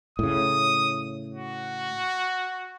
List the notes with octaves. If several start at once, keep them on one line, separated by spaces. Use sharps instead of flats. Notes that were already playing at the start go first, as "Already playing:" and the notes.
A2 C#3 D#6
F#4